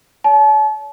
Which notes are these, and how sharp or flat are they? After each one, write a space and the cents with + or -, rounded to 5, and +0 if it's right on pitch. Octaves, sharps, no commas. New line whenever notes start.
C#5 +45 A5 -40